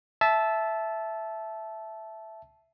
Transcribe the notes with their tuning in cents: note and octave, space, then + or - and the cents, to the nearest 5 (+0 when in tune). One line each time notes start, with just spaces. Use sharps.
E5 +0 A5 -15